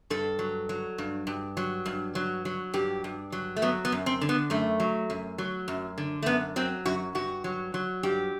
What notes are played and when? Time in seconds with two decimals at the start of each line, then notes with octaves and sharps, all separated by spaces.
0.10 G2 A4
0.39 F#3
0.69 F#3
0.98 G2
1.27 G2
1.57 F#3
1.86 G2
2.15 F#3
2.45 F#3
2.74 G2 G4
3.04 G2
3.32 F#3
3.56 A3
3.62 F#3 B3
3.85 B3
3.92 F#2
4.06 C4
4.21 D3
4.29 B3
4.50 F#2 A3
4.80 F#3
5.10 F#2
5.38 F#3
5.68 F#2
5.98 D3
6.22 A3
6.26 F#2 B3
6.56 F#3 C4
6.86 F#2 F#4
7.15 G2 F#4
7.44 F#3
7.74 F#3
8.03 G2 G4